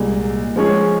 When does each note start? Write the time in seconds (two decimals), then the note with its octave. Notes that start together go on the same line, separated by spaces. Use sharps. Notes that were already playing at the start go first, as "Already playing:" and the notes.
Already playing: C2 A#2 G#3
0.56 F3 G#3 C#4 G#4 C#5